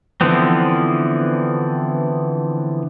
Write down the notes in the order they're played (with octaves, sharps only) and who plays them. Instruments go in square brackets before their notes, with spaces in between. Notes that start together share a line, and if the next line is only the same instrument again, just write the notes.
[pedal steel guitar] D3 E3 F3 B3 C4